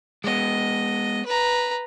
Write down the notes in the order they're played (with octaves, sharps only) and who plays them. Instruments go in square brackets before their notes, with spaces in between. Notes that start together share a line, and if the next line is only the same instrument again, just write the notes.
[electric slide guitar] G#3 B3 [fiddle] D#5
[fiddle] B4 A#5